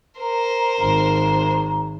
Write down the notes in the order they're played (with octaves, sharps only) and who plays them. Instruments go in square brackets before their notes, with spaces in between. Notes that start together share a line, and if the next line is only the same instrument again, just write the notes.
[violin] A#4 C5 [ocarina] A#5
[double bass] G#1 [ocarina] A#5